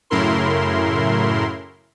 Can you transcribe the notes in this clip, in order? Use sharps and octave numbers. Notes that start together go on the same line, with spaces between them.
F#2 A2 C#3 E4 A#4 C6